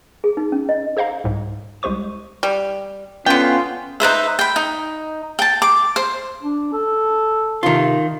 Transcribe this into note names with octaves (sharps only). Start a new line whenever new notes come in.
G#4
D#4
C#4
D#5
G#4 C5 D#5 F5 A#5
C2 G#2
C2 G#3 G4 C5 C#6 D#7
G3
D3 B3 C#4 F4 G5
D#4 B4 C5 E5
G5 B5
D#4
G5 A5
D6
C5
D4
A4
C3 D#3 F4